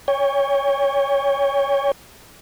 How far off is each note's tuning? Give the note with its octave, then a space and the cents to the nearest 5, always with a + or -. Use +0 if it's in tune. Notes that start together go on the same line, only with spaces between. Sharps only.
C#5 +15 G5 +45